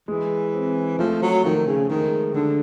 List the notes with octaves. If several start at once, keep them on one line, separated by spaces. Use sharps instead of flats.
E3 G#3
C4
F3 A3
F#3
D#3 F3
C#3
D#3 G#3
D3 D4